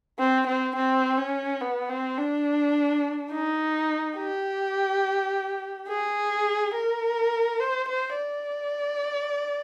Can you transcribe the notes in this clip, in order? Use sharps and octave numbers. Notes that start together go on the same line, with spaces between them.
C4
C4
C4
C#4
B3
C4
D4
D#4
G4
G#4
A#4
C5
C5
D5